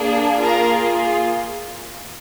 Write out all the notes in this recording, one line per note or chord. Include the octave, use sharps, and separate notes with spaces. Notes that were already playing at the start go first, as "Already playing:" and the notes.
Already playing: A#3 D4 G#4
A#3 F4 G#4 A#4